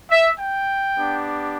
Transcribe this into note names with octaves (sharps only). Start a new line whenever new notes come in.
E5
G5
B3 D4 G4